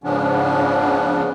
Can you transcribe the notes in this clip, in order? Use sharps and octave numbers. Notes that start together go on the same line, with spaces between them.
G#2 C#3 F3 B3 C#4 D4